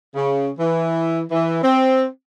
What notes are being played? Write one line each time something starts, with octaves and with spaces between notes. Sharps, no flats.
C#3
E3
E3
C4